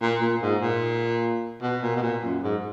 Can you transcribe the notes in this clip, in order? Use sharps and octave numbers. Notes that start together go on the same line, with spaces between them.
A#2
A#2
G#2
A#2
B2
A#2
B2
A#2
F#2
G#2